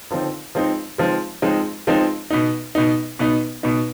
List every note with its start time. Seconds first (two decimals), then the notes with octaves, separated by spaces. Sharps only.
0.10 D3 F3 C4 D#4
0.55 F3 G#3 C4 D#4
0.98 F3 G#3 C4 D#4
1.42 F3 G#3 C4 D#4
1.87 F3 G#3 C4 D#4
2.30 B2 B3 D#4
2.75 B2 B3 D#4
3.19 B2 B3 D#4
3.63 B2 B3 D#4